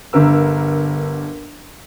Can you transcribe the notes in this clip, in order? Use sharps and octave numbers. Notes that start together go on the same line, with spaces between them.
G1 D3 A#4 E6